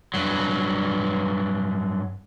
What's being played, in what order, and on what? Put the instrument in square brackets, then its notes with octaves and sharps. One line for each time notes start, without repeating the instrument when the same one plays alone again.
[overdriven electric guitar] G2 F#3